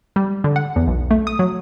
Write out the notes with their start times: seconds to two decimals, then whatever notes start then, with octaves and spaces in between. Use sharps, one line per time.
0.16 G3
0.44 D3
0.56 F#5
0.76 E2
0.88 B1
1.11 A3
1.27 D#6
1.39 F#3